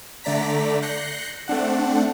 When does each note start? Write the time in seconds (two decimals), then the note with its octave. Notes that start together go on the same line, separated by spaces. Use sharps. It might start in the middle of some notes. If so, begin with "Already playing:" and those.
0.24 D3 A3 D5 A#5 B6
0.82 F#6 G6 A#6 C7 C#7
1.48 A3 C4 D4 F#5